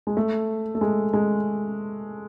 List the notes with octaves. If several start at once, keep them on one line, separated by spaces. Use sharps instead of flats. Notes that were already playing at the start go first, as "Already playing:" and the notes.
G#3
A3
A3
G#3
G#3